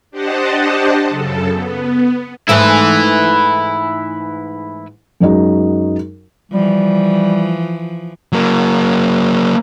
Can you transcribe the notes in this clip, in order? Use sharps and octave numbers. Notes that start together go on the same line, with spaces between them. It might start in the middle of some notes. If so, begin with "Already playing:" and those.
D4 G4 C5 D#5 F#5 A5
F#2 C#3 A4
B3
G#2 E3 A3 E4 B4
F#2 F#3 G#3 D#4 F#4
E3 F3 G3
F#3 A#3